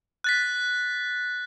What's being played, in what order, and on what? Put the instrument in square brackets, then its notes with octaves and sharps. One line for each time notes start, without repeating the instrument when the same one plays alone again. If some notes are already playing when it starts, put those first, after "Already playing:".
[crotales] F#6 A6 B6